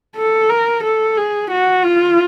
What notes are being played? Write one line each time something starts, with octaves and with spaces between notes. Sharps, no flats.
A4
A#4
A4
G#4
F#4
F4